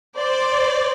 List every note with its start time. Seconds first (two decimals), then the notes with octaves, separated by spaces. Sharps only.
0.18 C5 D5